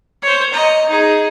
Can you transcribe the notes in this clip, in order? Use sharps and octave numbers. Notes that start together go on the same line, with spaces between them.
C5 C#5
D#5 A#5
D#4 G#4